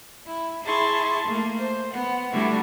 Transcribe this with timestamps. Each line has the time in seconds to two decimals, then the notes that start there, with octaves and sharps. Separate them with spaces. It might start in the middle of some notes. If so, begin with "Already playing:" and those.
0.25 E4
0.63 E4 G#4 A5 C6 C#6
1.27 A3 A#3
1.57 C5
1.92 B3 F#5
2.32 D3 G3 A3 B3 E4 F#4